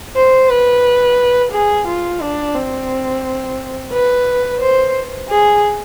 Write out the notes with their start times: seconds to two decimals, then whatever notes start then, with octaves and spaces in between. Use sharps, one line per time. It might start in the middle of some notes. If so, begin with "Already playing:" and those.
0.16 C5
0.49 B4
1.52 G#4
1.87 F4
2.21 D4
2.55 C4
3.92 B4
4.61 C5
5.29 G#4